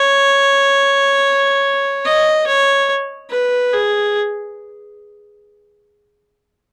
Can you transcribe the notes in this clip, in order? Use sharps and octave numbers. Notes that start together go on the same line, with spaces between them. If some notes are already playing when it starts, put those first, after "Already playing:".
Already playing: C#5
D#5
C#5
B4
G#4